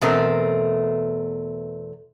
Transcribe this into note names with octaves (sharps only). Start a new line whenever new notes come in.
E2 B2 A3 C4 A#4